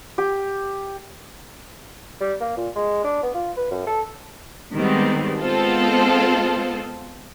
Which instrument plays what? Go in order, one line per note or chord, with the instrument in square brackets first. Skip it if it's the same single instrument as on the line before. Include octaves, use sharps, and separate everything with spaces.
[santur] G4
[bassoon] G3
A#3
A#2
G#3
D4
B3
F4
B4
F#2
A4
[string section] D#3 G3 G#3 B3 C4
G#3 B3 C4 F4 A4 C5